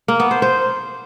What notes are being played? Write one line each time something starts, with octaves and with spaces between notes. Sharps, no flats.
A#3
B3
C5
C5